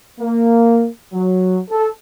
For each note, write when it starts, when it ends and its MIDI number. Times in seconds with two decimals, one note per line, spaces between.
0.19 0.87 58
1.13 1.59 54
1.70 1.90 69